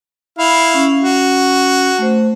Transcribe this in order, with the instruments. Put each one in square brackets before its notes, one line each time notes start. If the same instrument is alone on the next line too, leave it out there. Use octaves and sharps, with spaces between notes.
[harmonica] E4 F5 [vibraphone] B5
[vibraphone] C#4
[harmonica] F#4
[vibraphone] A3 C5